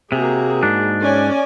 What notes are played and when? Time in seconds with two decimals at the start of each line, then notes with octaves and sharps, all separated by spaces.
0.12 C3 A#3 F#4 G#4
0.63 G#2 D4
1.02 C#4 D5 G#5